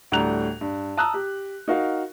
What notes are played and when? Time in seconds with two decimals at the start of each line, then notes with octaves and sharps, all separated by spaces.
0.12 D2 A2 G3 A#5 F#6 F7
0.61 G2
0.97 A5 A#5 D#6 E6 F#6
1.14 G4
1.68 D#4 F#4 A#4 F5